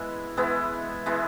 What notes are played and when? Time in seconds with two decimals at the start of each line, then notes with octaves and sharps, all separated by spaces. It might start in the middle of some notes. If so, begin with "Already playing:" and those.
Already playing: E3 G#3 B3 E4
0.37 E3 G#3 B3 E4
1.06 E3 G#3 B3 E4